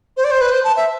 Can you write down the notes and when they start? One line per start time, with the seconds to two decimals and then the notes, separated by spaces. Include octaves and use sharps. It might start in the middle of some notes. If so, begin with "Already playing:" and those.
0.17 C5
0.24 D5
0.31 C5
0.41 B4
0.52 C5
0.64 A5
0.76 E5